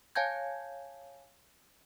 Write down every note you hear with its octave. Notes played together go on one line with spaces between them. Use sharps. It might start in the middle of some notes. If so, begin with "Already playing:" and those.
C#5 F5 G#5 A5 G6 G#6